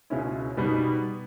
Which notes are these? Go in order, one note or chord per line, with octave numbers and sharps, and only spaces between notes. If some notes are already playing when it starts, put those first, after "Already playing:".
C#2 B2 G#3 C#4 E4
B2 G3 B3 D#4